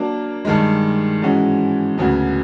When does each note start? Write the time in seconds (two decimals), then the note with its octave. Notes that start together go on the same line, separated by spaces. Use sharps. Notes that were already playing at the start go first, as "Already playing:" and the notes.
Already playing: F#3 A#3 D4
0.45 G2 D#3 G#3
1.22 G#2 E3 G#3 C#4 F#4
1.98 D2 C#3 F#3 B3